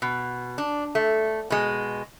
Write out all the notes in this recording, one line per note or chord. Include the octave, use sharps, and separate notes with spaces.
B2
D4
A3
B2 G#3